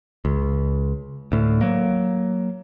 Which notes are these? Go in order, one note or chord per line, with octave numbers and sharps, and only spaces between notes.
C#2
D2 A2
F#3 A#3